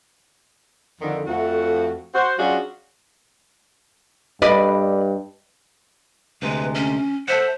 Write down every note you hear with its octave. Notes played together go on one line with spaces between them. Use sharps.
F2 D3 D#3
F2 A3 F#4
F#4 C5
F#3 C#4 D4 F4 F#4 G#4
G2 B4 D5 D#5
D2 C3 G#3 B4
C#4
A4 C5 E5 F#5